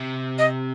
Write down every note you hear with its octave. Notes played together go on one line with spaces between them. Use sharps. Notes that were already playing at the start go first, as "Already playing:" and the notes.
Already playing: C3
D#5